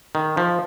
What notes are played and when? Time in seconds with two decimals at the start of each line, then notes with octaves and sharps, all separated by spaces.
0.15 D#3
0.37 F3